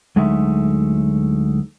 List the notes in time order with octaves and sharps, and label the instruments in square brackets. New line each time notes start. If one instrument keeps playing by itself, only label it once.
[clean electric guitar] D2 F#3 G#3 A3 D#4 E5